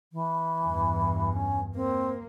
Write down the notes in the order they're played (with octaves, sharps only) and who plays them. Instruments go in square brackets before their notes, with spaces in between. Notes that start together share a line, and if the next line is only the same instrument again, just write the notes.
[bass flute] E3
[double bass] E2 G2
[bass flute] C#4
[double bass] A#3 [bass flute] C4